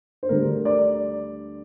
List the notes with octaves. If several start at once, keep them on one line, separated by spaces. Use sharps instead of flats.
C5
D2 D3 G3 A#4
D5